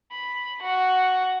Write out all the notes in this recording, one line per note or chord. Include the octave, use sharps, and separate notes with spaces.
B5
F#4